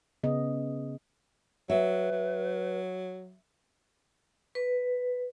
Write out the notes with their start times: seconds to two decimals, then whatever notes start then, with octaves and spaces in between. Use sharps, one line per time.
0.23 C#3 B3 D#5
1.70 F#3 B4 E5
2.11 F#3
4.55 B4